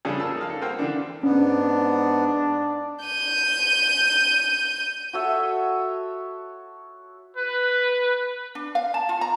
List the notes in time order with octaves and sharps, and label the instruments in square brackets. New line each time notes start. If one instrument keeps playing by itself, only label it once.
[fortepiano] C#3 F3 G3 D4 G#4 A4
A#3 A5 E6
D#4 F5
A4
A#3 F#4 C5 F5 G5
D3 E3 D4
[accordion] G#2 B3 [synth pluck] C#4 [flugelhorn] D4
[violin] G6 D#7
[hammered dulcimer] F#4 A4 C#5 E5
[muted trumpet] B4
[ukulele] D4
F5
A5
F4
A#5